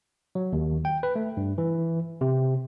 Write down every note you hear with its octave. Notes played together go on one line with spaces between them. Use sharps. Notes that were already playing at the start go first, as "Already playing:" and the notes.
F#3
D#2
G5
B4
A3
G2
E3
C3